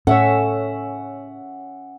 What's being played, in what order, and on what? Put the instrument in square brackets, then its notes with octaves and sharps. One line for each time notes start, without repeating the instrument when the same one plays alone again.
[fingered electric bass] A2 [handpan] C#4 E5 [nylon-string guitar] A4 C#5 [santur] F#5